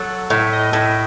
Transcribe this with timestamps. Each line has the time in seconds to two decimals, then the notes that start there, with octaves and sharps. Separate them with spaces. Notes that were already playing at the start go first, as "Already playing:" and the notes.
Already playing: F#3 A4
0.30 A2 E5
0.52 D#5
0.73 A2 E5